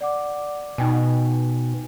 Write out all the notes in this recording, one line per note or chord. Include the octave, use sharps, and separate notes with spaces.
D5 F#5 D6
B2 D#4 G5 G#5